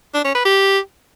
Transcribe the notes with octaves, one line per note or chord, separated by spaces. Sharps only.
D4
C#4
B4
G4